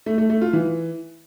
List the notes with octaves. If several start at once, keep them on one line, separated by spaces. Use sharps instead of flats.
A3
A3
A3
F4
E3